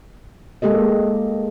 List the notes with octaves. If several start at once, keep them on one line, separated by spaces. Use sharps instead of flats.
G#3 A#3 G4 A4 D#5